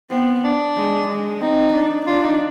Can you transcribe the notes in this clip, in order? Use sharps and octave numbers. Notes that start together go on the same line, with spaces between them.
B3 C4
D4
G#3
G#3
C4 D#4
D4
D4 F4
D#4